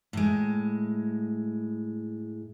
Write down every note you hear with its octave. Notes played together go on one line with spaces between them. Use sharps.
A2 G#3